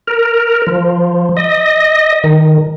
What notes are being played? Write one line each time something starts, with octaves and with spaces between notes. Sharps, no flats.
A#4
F3
D#5
D#3